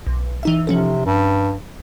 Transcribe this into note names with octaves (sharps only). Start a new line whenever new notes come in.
B1
E3 D#4 E5
C3 F3 C#4 A4
G2